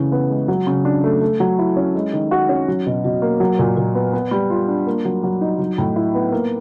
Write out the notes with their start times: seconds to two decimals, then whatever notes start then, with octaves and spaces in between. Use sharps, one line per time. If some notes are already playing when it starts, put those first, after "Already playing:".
Already playing: C#3 E3 A3
0.12 B3
0.30 G#3
0.48 F#3
0.67 C#3
0.85 D4
1.04 A3
1.21 A3
1.40 F#3
1.59 E4
1.77 C#4
1.95 G#3
2.13 D#3
2.31 F#4
2.49 C#4
2.68 F#3
2.86 B2
3.05 B2
3.22 A#3
3.40 F#3
3.59 A#2
3.77 A#2
3.95 B3
4.13 B3
4.31 G3
4.50 F4
4.68 D4
4.86 A#3
5.05 F#3
5.24 F#3
5.41 D#4
5.59 F#3
5.78 A2
5.96 E4
6.15 B3
6.32 A#3